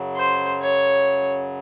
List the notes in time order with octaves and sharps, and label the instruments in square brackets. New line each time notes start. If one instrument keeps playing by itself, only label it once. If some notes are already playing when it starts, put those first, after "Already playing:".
Already playing: [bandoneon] F#2 C#3 F#3
[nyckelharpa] C5
C#5